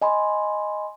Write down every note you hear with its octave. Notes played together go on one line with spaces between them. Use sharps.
D#5 G#5 B5 C6